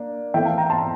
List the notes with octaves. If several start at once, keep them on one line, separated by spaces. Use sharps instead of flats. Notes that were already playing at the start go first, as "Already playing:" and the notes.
Already playing: A#3 D4
E3 A3 C4 E5 G5
F5 A5
G5 A#5
A5 C6